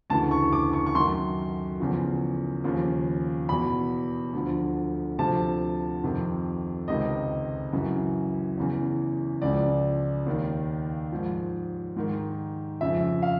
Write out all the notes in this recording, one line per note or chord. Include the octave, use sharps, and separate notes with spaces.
D2 C#3 E3 A5
C#6
D6
C#6
C#6
F#2 D#3 C6
E2 C#3 F3
D#2 C#3 F3
E2 B2 B5
D2 D3 F3
D2 C3 F3 A5
F2 C3 D#3
C#2 C3 D#3 D#5
F#2 C#3 E3
E2 C#3 E3
C#2 C#3 F3 D5
D#2 D#3
G#2 F3
G#2 D#3
F2 C#3 F3 E5
F5